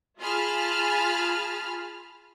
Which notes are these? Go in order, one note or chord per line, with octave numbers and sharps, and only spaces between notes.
F4 G#4 A5 B5 F6